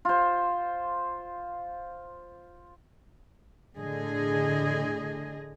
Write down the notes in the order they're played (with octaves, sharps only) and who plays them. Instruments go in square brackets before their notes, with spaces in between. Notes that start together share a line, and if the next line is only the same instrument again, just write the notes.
[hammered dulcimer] F4 C5
[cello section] A2 D3 G#4 D#5